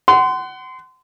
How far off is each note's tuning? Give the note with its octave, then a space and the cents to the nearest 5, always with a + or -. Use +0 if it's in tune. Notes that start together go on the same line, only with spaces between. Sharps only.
F#5 +25 C6 -25